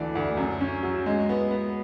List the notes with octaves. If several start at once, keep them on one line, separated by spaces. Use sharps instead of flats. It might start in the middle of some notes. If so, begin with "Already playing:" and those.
Already playing: D2 E3 D4 D5
D2
F#2
C#4
F#3
G#3
B3
B3